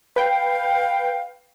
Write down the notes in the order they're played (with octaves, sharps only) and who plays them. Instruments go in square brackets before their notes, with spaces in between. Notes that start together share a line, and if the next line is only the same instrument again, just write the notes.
[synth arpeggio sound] B4 G5 [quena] F5